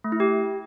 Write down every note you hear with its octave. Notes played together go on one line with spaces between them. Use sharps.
A3
E4
G4